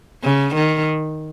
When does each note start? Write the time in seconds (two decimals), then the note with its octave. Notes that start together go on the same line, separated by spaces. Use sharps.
0.24 C#3
0.55 D#3